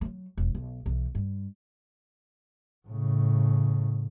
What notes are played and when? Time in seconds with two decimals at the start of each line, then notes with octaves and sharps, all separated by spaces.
0.01 F#3 A3
0.38 E1
0.55 B1
0.86 B1 E3
1.15 G2
2.88 A2 C#3